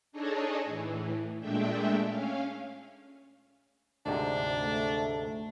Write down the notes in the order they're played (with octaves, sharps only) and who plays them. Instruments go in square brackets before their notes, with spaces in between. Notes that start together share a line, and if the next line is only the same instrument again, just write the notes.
[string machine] D4 D#4 G#4 A4 C#5 D#5
A2 E3
A#2 G#3 A3 D4 E5 G5
C#4 F5
[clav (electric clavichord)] D2 G#2 C3 [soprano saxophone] D4
[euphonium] A3